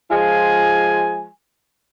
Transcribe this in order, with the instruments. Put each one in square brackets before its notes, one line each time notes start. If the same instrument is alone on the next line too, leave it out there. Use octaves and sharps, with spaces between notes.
[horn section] F3 G#3 F4 G#5